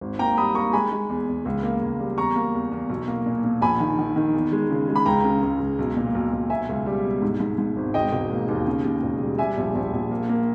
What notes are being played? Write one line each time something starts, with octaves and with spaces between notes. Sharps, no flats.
G#1
A#3 G5 A#5
G3 B5 D#6
A#3 A#5 C#6
G#3 G#5 B5
G#3
E2
E2
C#2
A#3
C#2
G3
E2 A#5 C#6
A#3
E2
E2
B1
A#3
A#2
A#2
A#1 G#5 B5
D#3
D#3
D#3
E2
G#3
C#3
G#3
B5
C#2 G5 A#5
C#3
C#2
C#2
B1
A#2
B1
B1
B2 E5 G#5
C#2
G3
B2
G#2
G#2
G#2
G#1
E1 D#5 G5
E1
A#3
D#2
C#3
D#2
E1
G3
G3 E5 G#5
A#1
A#1
A#1
A#3
A#3